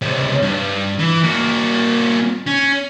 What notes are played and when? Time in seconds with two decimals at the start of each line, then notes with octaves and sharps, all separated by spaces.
0.02 C#2 C3
0.43 G2
0.99 E3
1.24 A#3 F#4
2.47 C#4